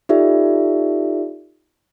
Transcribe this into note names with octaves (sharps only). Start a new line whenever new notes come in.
D#4 F4 G4 A4 D5 E5